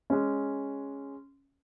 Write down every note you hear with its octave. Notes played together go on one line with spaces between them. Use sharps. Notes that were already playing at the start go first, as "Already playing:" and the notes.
G#3 C#4